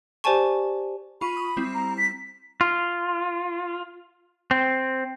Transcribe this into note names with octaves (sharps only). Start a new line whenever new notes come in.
G4 C5 D5 G#5 A5 C#6
F4 B5 C#6 D#7
D#6
G3 C4 E4
A#5
B6
F4
C4